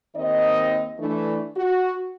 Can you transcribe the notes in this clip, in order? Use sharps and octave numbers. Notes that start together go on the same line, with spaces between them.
D#2 D#3 C4 D#4 D#5
E3 A3 D4
F#4